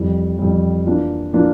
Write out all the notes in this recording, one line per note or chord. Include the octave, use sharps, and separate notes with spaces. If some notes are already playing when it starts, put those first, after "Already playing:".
Already playing: F2 E3 G3
F2 E3 G3
E3 A#3 D4 F4
E3 A#3 D4 F4